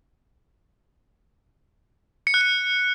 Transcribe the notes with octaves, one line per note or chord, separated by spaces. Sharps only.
C#7
F#6
C#7